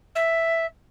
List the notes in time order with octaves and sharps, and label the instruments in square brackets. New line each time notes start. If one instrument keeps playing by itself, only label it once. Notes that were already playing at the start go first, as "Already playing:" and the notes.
[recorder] E5